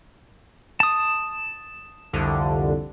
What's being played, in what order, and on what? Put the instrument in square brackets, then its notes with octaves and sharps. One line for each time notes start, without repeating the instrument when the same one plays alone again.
[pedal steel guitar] A5 D#6
[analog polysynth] C2 F2 D3